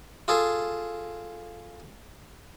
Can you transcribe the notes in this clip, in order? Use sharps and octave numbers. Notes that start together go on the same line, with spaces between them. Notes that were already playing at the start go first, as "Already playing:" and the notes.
F4 G#4 A4